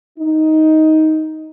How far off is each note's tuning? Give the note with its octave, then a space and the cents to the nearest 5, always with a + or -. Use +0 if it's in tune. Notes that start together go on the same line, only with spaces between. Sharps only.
D#4 +10